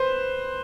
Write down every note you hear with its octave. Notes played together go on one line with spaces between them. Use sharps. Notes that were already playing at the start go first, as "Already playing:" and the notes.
Already playing: B4 C5